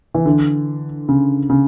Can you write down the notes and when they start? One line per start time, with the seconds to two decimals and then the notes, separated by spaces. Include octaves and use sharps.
0.14 E3
0.26 D3
1.09 C#3
1.50 C#3